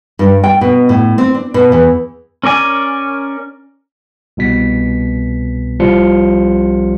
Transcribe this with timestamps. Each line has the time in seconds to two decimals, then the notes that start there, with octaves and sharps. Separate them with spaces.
0.19 G2
0.44 G5
0.61 B2
0.89 A2
1.18 C4
1.34 D4
1.54 B2
1.72 E2
2.43 C#4 A#4 D5 G#5
4.37 C2 B2 B6
5.80 C2 F3 G3 F4 C6 C#7